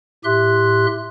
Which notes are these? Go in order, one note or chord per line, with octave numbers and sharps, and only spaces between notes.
A2 G4 E5 C6 F#6